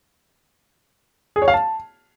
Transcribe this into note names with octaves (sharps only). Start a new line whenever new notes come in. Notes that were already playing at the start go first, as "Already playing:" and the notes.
G#4
C#5
F5
A5